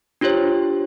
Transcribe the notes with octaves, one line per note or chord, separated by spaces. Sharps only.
D4 F4 G4 C5 C#5